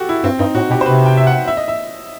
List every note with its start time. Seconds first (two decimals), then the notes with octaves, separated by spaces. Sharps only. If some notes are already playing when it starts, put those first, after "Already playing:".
Already playing: F#4 G4 A4
0.09 E4
0.24 G2 C4
0.39 G2 D#4
0.55 A2 F#4
0.70 B2 G4
0.81 C5
0.86 C3 B4
1.06 G5
1.17 E5
1.27 F#5
1.47 E5
1.57 D#5
1.68 E5